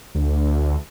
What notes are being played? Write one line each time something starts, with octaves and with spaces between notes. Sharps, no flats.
D2